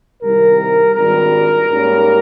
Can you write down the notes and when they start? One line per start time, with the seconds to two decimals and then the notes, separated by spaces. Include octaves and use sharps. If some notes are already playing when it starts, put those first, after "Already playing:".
0.21 C2 C3 D#3 G3 A#4
0.95 G#1 G2 D#3 G3 A#4
1.69 G#2 G3 A#3 C#4